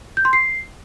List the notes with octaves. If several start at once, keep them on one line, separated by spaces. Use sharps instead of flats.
G6
C6
C7